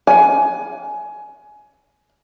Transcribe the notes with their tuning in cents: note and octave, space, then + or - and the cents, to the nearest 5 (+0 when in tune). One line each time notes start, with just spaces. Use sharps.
G#5 +20